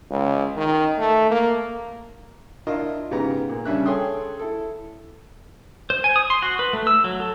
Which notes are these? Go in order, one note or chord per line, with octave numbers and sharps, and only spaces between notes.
C#2
D#3
A3
A#3
D4 E4 F4 A#4 D#5
G#2 C#3 B3 G4 A#5
A#2
C#3 G3 C#4 D4 E5 F#6
G#4 A4 C#5 G5 C6 D#6
E4 A4
C5
G#5
D#6
C6
F#4
B4
A3
E6
F#3
A4